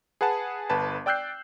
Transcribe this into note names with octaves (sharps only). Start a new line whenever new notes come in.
G#4 B4 F#5 A5
G1 B4 A5
D5 G5 E6 F#6 G6 C7